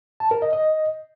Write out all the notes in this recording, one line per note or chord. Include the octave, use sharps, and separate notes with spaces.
A5
A#4
D#5
D#5